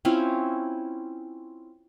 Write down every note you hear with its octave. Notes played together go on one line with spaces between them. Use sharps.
C4 C#4 E4 F4